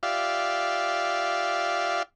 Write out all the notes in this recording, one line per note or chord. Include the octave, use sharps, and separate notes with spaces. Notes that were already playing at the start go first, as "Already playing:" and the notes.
F4 G4 D5 E5 F5